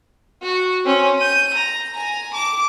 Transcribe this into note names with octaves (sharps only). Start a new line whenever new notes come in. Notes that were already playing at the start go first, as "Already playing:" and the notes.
F#4
C4 C#4
G6 D#7
A#5
G#5 A#5
A5 D6